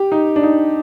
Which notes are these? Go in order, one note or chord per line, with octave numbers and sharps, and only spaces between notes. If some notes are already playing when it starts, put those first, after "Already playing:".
Already playing: G4
D#4
D4
D#4